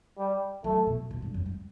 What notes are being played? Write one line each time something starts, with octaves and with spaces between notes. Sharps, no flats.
G3
F#3 A3
B2
B2
G2
F#2
G2